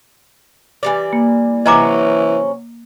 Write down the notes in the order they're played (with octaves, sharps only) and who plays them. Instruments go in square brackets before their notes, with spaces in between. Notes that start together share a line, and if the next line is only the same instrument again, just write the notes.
[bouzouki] E3 G3 D5
[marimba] A#3
[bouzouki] C3 F#3 C#4 [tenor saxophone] E3 [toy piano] D#5 A#5 D6